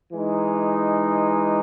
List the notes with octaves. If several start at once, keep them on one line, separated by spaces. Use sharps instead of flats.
E3 G#3 D#4